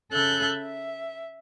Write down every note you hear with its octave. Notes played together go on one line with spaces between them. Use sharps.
C#3 A4 E5 F#6 G6
E5